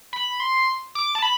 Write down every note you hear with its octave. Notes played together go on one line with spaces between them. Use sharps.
B5
C6
D6
A5
B5